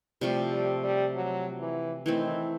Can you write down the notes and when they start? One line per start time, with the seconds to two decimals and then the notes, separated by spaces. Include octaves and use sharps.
0.21 C3 F3 G3 A3
0.53 G3
0.84 G3
1.14 F#3
1.60 E3
2.06 D#3 E3 A3 C4